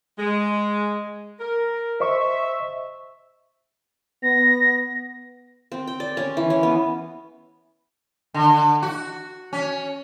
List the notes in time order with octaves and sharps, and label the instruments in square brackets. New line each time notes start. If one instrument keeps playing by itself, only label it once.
[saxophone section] G#3
A#4
[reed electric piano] C5 D#5 C#6 [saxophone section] E5
[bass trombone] B3 [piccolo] A#6
[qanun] C4
G5
D5
C#4
E3
C#4
B3
[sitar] D3
F#4
C#4